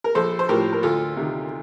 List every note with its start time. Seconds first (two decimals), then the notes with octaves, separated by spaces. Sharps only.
0.04 A#4
0.15 A#1 A4 C5
0.39 C5
0.49 A2 F3 G4 A#4
0.73 A#4
0.83 D2 F4 A4
1.17 C3 D#3